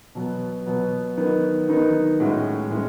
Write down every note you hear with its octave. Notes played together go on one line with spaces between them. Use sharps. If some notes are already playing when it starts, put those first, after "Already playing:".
B2 F#3 B3
B2 F#3 B3
D#3 F#3 B3 D#4
D#3 F#3 B3 D#4
A2 G#3 C#4 F#4
A2 G#3 C#4